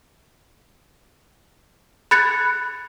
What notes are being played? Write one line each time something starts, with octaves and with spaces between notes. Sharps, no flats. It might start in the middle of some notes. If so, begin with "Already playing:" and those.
B5 F#6 G#6 A6 C#7